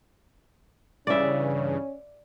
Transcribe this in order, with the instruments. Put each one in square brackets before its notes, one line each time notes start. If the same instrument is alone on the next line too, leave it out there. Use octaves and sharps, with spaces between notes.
[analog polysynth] G2 C#3 E3 [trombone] C#4 [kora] D5 E5